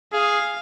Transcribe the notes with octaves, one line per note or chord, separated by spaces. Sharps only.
G#4 F5